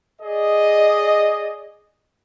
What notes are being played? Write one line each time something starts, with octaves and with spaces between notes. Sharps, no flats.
G#4 D5 D#5